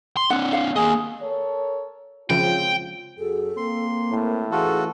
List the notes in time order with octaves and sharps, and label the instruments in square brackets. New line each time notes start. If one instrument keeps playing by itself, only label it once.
[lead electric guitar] C6
[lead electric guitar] C4 D4 [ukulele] F#5
[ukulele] F5 F#5
[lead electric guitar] A#3 D#5 [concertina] G#4
[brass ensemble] A4 A#4 C#5
[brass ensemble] E2 C4 F4 [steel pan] C#3 F3 [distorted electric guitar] G5
[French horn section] F#2 F#4 G#4 [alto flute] A4
[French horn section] A#3 C4 [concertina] C6
[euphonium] A2 [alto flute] A#4
[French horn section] E3 A3 C#4 [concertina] F4 F#4 A4 [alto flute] G#4